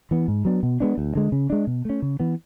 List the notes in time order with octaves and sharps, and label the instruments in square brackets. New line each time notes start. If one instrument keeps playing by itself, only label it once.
[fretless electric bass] E3 B3
G#2
F#3 B3 D4
B2
G#3 B3 D4
D2
D3 G#3
C#3
G#3 D4
B2
A3 C#4
C#3
E3 B3